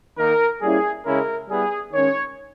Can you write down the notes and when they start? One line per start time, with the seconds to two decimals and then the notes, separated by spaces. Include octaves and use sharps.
0.18 D#3 A#3 D#4 A#4
0.62 G3 A#3 C#4 E4 G#4
1.06 C#3 G#3 C#4 E4 A#4
1.49 G3 B3 E4 G#4
1.93 D#3 G#3 C#4 C#5